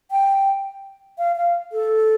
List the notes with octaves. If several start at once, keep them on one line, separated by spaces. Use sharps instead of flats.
G5
F5
F5
A4